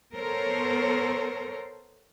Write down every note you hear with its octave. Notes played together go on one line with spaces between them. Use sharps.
B3 A4 A#4 C5 C#5